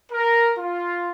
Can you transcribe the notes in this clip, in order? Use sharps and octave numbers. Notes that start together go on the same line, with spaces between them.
A#4
F4